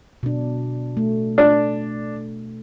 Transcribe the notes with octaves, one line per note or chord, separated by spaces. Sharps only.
B2 D4
A3
D4